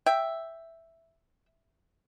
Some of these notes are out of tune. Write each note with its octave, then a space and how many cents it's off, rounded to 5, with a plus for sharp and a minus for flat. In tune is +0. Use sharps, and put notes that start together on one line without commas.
E5 +0 G5 +0